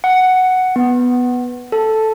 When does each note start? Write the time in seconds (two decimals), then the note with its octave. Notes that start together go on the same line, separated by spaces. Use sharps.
0.04 F#5
0.76 B3
1.72 A4